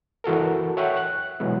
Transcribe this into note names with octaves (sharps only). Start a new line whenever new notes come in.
E3 F#4 A4 A#4
C#5 E5 F#5 G5 C#6
F#6
B2 E3 F#3 G#3 B3